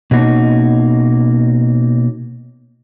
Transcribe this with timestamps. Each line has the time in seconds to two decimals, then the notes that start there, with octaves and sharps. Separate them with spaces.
0.11 B2 A#3 C#4 D#4 F#4